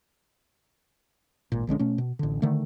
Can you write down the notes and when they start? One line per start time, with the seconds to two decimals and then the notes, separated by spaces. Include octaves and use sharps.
1.52 G#1 A#2
1.67 A#1 D3 G#3 C#4
1.79 B2 A3 C#4
1.98 B2
2.19 A1 D3
2.42 D3 D#3 A3